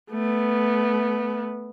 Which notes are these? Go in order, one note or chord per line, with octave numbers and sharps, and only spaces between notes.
A3 B3